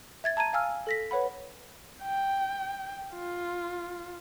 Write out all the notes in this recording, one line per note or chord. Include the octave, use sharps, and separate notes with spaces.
E5 G#6 A6
A5 A#5 G#6 D#7
F5 G#5 E6 F6
A4 A#6 B6
B4 C#5 F#5 B5
G5
F4